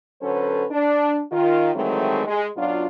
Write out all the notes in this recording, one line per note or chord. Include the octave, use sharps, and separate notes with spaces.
D3 F#3 C#4 A4 B4 C5
D4
D#3 F4
D#3 E3 F#3 G#3 A3 C4
G#3
F#2 B2 F#3 D4 F4